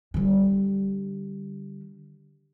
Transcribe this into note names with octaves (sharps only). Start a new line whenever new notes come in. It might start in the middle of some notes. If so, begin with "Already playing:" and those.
D3 G3